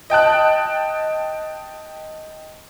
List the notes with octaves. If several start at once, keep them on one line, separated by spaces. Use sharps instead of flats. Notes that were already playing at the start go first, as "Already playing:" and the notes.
D#5 G5 A5 F#6